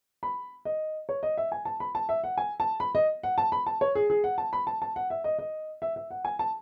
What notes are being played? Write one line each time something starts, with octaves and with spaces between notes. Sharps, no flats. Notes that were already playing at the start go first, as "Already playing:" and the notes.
B5
D#5
C#5
D#5
E5
G#5
A5
B5
A5
E5
F#5
G#5
A5
B5
D#5
F#5
A5
B5
A5
C#5
G#4
G#4
F#5
A5
B5
A5
A5
F#5
E5
D#5
D#5
E5
E5
F#5
G#5
A5